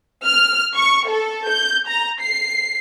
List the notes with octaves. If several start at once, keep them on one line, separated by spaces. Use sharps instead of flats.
F6
C#6
A4
G6
A#5
C7